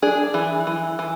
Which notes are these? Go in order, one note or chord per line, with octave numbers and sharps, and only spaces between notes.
D4 G#4
E3
E3
E3